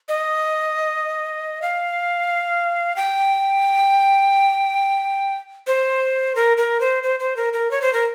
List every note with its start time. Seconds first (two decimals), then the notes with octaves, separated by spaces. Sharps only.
0.09 D#5
1.62 F5
2.96 G5
5.67 C5
6.36 A#4
6.57 A#4
6.81 C5
7.03 C5
7.20 C5
7.37 A#4
7.53 A#4
7.71 C#5
7.82 C5
7.93 A#4